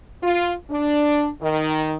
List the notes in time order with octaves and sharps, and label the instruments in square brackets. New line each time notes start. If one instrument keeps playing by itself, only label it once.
[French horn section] F4
D4
D#3